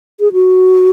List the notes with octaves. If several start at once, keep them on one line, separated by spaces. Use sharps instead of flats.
G#4
F#4